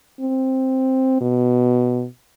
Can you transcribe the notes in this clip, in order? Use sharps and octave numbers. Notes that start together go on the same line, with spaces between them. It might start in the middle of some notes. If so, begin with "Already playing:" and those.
C4
B2